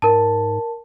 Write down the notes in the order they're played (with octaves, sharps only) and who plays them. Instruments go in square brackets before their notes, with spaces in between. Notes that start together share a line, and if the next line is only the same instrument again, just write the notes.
[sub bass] G#2 [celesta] A#4 A5